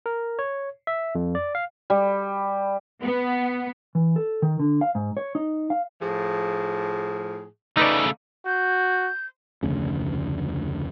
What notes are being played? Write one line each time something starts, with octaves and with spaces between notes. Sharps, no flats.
A#4
C#5
E5
F2
D5
F5
G3
B3
E3
A4
D#3
D3
F5
G#2
C#5
D#4
F5
A2 F3 G#4
C#3 A3 D#4 B4 D5
F#4 G6
F1 D2 C#3